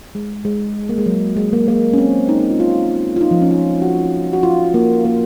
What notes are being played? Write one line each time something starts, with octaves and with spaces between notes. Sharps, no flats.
G#3
G#3
A#3
G#3
F#3
G#3
A#3
A#3
C#4
C4
D#4
D#4
F4
F4
F4
D#4
F3
C#4
F4
F#4
F#4
F4
A#3
A#3